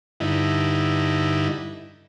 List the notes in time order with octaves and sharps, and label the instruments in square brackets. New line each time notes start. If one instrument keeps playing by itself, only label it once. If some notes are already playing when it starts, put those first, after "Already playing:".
[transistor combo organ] G2 D3 D#4 E4